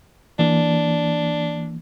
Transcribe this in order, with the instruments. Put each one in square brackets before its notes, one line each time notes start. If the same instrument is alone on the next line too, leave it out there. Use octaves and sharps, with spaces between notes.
[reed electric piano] E3 A#3 [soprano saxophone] D4